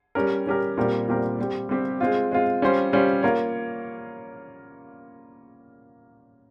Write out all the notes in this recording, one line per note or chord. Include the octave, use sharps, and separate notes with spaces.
G3 C#4 G4 A#4
G3 C#4 G4 A#4
A#2 G3 C4 G4 A#4
A#2 G3 C4 G4 A#4
G3 C4 G4
G3 C4 G4
G#3 C4 F4
G#3 C4 F4
G3 C#4 F4 C5
G3 C#4 F4 C5
A#3 F4 A#4 C#5